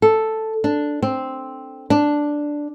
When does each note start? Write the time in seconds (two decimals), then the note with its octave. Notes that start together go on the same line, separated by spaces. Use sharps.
0.02 A4
0.64 D4
1.03 C4
1.90 D4